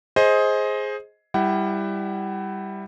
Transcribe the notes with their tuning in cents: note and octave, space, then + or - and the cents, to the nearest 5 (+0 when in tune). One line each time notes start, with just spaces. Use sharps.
G#4 +10 C5 +15 D#5 +15
G3 +10 E4 +0 F#5 +35